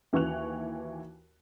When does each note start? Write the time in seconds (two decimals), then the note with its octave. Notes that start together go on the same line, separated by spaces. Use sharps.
0.13 D#2 E3 F#4 C#6 F#6 F7